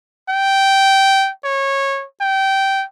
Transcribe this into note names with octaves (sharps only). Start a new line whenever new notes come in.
G5
C#5
G5